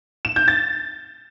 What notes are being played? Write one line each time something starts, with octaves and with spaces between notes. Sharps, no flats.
E7
G6
A6